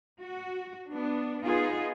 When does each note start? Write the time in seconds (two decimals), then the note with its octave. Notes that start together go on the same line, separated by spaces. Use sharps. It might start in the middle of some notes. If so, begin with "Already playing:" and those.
0.21 F#4
0.90 B3 D4
1.44 B3 D#4 F4 G#4